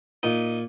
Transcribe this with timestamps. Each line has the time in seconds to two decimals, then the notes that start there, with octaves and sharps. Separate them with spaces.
0.23 A#2 D#4